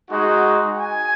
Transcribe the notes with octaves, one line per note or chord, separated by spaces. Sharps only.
G#3 D#4 F#4
G#5